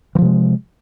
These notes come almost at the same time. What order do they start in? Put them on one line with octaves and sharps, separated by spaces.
E3 F3 C3 G#3